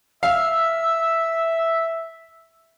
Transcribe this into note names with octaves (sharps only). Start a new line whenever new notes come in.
E5 F5 E6